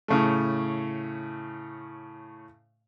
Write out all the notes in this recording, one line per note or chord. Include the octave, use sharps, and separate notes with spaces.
A2 C#3 A3